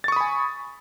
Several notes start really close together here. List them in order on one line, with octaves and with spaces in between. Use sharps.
A6 C#6 D#6 B5 G#5